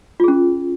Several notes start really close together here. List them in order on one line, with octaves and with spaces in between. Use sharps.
F4 G#4 C#4